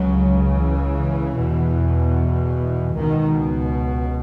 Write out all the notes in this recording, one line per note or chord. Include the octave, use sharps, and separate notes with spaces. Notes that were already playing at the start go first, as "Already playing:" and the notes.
Already playing: C#2 C#3 F#3
E3
E2 B2
C#2 B2 D#3